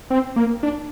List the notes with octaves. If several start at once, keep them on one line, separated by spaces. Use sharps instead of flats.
C4
A#3
D4